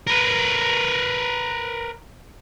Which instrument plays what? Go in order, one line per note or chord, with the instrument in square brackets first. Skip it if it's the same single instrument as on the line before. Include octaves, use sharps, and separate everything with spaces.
[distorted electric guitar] A#4 B4